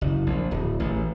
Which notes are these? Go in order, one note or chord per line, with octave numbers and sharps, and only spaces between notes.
F#1
A#1
D1
A1